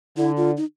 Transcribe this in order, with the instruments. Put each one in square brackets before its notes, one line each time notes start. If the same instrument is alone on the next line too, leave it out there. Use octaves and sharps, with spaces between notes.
[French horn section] D3 [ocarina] E4
[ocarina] F4
D#4